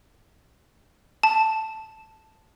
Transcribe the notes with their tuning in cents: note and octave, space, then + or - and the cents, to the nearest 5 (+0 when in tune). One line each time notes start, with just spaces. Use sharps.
A5 +0